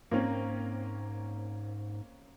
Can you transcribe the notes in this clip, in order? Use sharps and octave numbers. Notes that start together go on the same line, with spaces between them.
G#2 A#3 C4 C#4